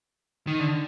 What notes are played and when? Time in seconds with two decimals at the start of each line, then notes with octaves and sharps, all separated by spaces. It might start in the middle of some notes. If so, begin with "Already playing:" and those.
0.47 D#3
0.59 D3